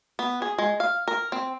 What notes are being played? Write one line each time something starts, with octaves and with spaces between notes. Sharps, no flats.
B3
G#4
G#3
F5
A#4
C4